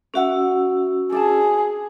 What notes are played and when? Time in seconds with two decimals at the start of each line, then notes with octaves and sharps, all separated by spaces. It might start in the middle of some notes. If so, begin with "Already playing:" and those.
0.14 C#4 F#4 A#4 E5 F#5 E6
1.12 D4 G#4 D5 A5